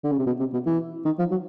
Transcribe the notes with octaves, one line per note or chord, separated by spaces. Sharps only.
D3
C#3
C3
B2
C3
B2
E3
D#3
F3
F#3